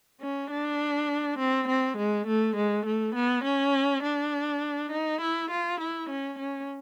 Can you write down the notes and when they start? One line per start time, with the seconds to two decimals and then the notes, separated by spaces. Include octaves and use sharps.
0.21 C#4
0.50 D4
1.39 C4
1.68 C4
1.98 G#3
2.27 A3
2.57 G#3
2.86 A3
3.15 B3
3.45 C#4
4.03 D4
4.92 D#4
5.21 E4
5.51 F4
5.80 E4
6.10 C#4
6.39 C#4